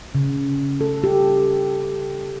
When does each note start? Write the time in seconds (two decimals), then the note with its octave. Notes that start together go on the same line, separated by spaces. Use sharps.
0.15 C#3
0.81 A4
1.04 G4